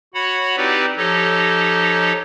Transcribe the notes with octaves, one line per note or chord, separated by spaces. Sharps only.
F#4 C#5 F#5 B5
C4 D#4 E4 G4 B4 D5
F3 D#4 G4 A4 C#5 D#5